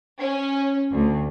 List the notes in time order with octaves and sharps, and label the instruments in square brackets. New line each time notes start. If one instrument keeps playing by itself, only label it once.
[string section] C#4
D2